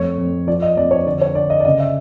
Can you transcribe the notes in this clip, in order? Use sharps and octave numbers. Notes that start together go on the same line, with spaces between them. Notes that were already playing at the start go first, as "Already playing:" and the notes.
Already playing: F2 A3 C#5
F2
F3 D5
D#5
F2 D5
C#5
D3 D5
C#5
D3 D5
D#5
D5
C#3 D#5
E5